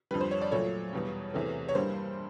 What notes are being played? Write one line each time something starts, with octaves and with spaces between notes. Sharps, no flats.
F2 D3 G3 B4
C5
C#5
D5
A#2 F#3 A3 C#5
E2 B2 G3
E2 C3 E3 A3
C#5
G2 E3 G3 A#3 C5